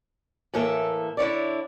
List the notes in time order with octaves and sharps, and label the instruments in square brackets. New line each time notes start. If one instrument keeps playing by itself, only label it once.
[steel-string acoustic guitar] A2 E3 A#3 A4 E5
D3 E4 C#5 D5